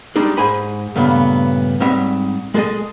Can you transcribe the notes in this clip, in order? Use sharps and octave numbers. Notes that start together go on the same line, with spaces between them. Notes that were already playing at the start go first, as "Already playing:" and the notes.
G3 G#3 D4 D#4 G#4
G#2 G#4 C5 G#5 B5
G2 A#2 C#3 A3 B3
G#2 G3 C4 C#5 E5 F#5
G#3 G#4 A4 C5 D#5 G#5